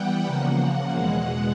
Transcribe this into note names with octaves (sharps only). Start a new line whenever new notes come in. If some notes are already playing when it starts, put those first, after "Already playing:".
Already playing: E3 G3 B3 F#5 G5
C#3 F3 A#3
E2 B2 G#3